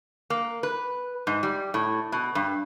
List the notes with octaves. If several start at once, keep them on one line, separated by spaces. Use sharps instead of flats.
A#3
B4
G#2
G3
A2
B2
G2